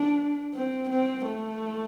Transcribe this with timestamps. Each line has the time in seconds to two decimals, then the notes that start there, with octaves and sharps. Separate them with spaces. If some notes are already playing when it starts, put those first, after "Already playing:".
Already playing: D4
0.54 C4
0.90 C4
1.25 A3